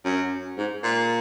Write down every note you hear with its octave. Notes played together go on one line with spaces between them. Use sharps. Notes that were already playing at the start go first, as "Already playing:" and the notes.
F#2
G#2
A#2